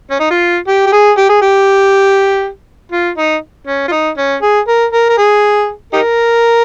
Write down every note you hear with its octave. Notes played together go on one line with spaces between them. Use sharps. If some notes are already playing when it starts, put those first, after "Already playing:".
C#4
D#4
F4
G4
G4
G#4
G4
G#4
G4
F4
D#4
C#4
F4
D#4
C#4
G#4
A#4
A#4
A#4
G#4
D#4 G4 A#4